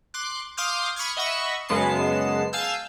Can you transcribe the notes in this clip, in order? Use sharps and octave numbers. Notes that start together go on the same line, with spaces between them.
C6 D6 F#6
F5 C6 D6 D#6 F6 G6
B5 C#6 D#6 F6 G#6
D#5 E5 F#5 B5 C#6 E6
F#2 C#3 G#3 B3 A5 C7
F5 G#5 A5 E6 G6